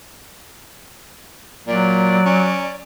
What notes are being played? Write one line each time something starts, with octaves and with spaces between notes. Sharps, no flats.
A#2 F#3 D5
C#4